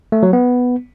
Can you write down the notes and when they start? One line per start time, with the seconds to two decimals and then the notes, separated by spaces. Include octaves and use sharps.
0.12 A3
0.23 F#3
0.33 B3